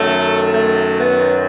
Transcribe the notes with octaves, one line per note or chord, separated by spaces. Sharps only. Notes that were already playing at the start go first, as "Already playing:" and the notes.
Already playing: F#2 D#3 F#3 A3
A3
B3